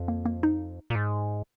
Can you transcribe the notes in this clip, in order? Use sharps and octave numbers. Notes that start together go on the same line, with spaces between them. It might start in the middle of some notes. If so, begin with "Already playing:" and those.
Already playing: F2
A#3
A#3
D#4
A#2
G#2